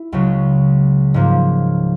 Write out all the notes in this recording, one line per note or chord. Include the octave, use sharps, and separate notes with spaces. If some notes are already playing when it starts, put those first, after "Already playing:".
Already playing: E4
C#2 C#3 F#3
G#2 F3 A#3